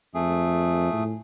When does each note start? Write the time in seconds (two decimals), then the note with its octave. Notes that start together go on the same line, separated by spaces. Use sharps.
0.14 F2 A3 G#4
0.93 A2